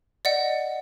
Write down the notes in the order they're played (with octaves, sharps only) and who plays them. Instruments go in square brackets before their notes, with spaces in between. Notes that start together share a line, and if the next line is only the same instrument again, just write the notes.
[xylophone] D5 D#5 F#5